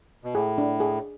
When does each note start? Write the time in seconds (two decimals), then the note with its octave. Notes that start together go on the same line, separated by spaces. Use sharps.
0.24 B2
0.34 A2 G#4
0.58 D4
0.80 G#4